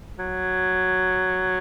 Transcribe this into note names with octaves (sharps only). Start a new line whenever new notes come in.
F#3